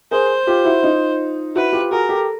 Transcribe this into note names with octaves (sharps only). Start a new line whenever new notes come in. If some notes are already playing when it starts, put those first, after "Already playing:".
G#4 A#4 C5
F4 G4
E4 F#4
D#4 F4
E4 F#4 B4
F4 G4
F#4 G#4 A#4
G4 A4